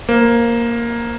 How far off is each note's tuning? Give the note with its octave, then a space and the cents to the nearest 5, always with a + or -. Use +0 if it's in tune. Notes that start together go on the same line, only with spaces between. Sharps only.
A#3 +5 C5 +0